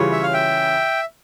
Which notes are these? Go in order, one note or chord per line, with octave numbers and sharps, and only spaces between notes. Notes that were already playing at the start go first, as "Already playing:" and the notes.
Already playing: C#3 E3 G3 C#4 F4 C#5
E5
F5
E5 G5